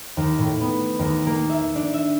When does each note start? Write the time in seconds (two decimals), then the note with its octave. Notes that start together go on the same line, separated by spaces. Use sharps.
0.17 D#2
0.38 A2
0.61 B3
0.99 D#2
1.26 A#3
1.49 E5
1.75 D4
1.93 E5